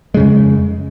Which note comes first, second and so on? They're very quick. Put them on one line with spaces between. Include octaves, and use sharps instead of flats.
G#3 C#3 F2